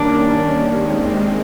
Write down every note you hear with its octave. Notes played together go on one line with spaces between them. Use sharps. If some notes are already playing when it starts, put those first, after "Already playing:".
Already playing: D#3 G3 A#3 C#4 D4
D#2 D#3 G#3 C4